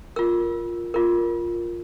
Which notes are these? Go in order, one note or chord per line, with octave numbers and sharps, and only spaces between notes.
F4 A#4 E6
F4 A#4